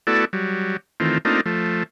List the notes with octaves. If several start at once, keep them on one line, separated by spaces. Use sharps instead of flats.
A3 B3 E4 F#4 A4 D5
F#3 G3
D#3 E3 A3 C4 F4
A3 A#3 C4 D4 D#4 F4
F3 A3